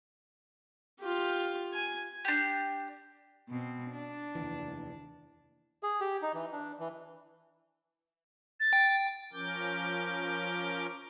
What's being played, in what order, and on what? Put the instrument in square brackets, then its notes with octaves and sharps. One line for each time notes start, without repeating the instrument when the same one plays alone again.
[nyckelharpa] F4 G4
G#5
[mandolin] D4 G4
[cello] B2 C4
D4
[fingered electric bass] F1 D#2 E3
[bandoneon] G#4
G4
D#4
E3
D4
E3
[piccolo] A6
[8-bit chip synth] G5
[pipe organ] F3 C#4 A#4 D6 G6